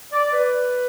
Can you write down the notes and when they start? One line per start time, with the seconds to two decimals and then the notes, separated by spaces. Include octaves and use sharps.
0.12 D5
0.32 B4